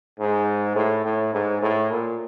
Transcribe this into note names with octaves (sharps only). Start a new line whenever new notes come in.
G#2
A2
A2
G#2
A2
A#2